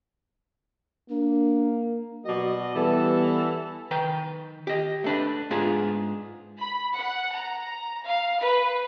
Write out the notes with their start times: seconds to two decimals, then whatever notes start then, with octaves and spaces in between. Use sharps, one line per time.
1.10 A#3 D4
2.26 B2 F#3 F#4 D5 D#5
2.74 E3 G3 B3 A4
3.91 D#3 B4 G5
4.67 G4 D#5
5.04 A3 D4 B4
5.51 G#2 B3 D4 F4 G#4
6.58 B5
6.96 F#5
7.33 A#5
8.06 F5
8.39 B4